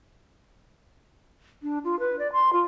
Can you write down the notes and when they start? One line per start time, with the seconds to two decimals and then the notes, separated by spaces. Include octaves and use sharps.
1.63 D4
1.84 F4
1.99 B4
2.19 D5
2.33 C6
2.53 F4